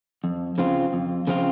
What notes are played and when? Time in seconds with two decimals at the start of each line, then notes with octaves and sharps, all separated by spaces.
0.24 F2
0.58 C#3 F3 C4 F4
0.93 F2
1.27 C#3 F3 C4 F4